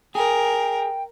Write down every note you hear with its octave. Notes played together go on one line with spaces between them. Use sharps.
G#4 A#4 G5